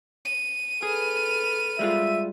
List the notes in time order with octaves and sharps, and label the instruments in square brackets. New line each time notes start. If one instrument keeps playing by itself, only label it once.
[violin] D#7
[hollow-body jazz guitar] G#4 [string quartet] A4 B4 F6
[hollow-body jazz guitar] G3 G#3 F4 [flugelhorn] E5